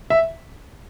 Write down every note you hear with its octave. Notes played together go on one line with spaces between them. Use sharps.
E5